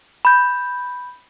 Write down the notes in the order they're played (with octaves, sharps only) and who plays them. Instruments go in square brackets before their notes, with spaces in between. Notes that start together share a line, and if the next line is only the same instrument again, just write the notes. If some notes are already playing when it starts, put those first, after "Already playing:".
[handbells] B5 G6